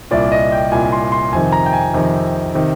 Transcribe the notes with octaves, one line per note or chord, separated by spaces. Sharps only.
C2 A#2 D5
D#5
G5
C2 A#2 G#5
C6
C6
F2 C3 D#3 G#5
A#5
G5
G#5
F2 C3 D#3
C3 D#3